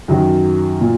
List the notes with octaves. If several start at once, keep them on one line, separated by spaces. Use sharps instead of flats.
F#2 D#3 F#3 F#4
A#2